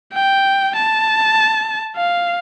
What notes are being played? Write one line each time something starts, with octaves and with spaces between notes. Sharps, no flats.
G5
A5
F5